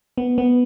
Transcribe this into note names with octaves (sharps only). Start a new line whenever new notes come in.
B3
B3